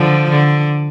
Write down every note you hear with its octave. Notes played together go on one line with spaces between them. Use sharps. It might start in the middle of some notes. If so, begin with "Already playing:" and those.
Already playing: D3 F3
D3